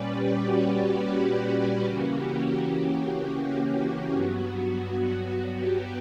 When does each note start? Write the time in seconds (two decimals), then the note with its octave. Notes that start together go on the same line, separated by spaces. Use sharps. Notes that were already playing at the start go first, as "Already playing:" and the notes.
Already playing: A#2 G3 C#4 B4 D5
0.13 G4
0.41 F#4
0.71 G4
1.83 C#3 E3 A#3 C#4 F#4
2.12 G4
2.41 G4
2.69 F#4
4.11 G2 F#3 B3 F#4
5.25 F#4
5.53 G4